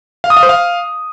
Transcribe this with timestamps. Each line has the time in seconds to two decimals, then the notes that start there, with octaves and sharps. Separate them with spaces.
0.24 F5
0.30 D#6
0.37 F5
0.43 C5
0.49 F5